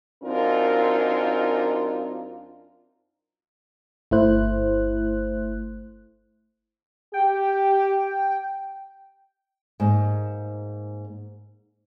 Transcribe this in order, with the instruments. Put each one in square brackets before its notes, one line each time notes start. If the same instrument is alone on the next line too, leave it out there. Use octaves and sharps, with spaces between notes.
[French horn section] F#2 C4 D4 D#4 F4 A#4
[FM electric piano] G1 A3 E4 C5 F#6
[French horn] G4 [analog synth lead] G5
[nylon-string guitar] G#2 A#3